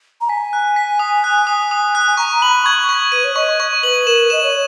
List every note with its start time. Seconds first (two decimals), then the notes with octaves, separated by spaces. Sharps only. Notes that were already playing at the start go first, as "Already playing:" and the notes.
0.21 A#5
0.29 G#5 B6
0.53 F#6
0.76 B6
0.99 D#6
1.24 F#6
1.47 D#6
1.71 D#6
1.95 F#6
2.07 G#5
2.17 A#5 C#6
2.42 B5 F#7
2.65 C#6 G#6
2.89 C#6
3.12 B4 D#7
3.24 C#5
3.36 D#5 C#6
3.60 C#6
3.83 B4 F#7
4.06 A#4 E7
4.30 D#5 E7
4.43 C#5